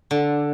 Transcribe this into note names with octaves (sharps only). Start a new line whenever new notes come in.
D3